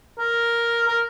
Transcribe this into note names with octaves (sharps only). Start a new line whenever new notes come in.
A#4
A#4